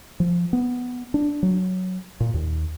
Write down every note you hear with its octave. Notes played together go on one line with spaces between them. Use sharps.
F3
B3
D4
F#3
A#2
D#2